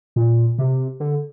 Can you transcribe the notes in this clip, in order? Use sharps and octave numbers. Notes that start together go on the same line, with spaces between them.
A#2
C3
D3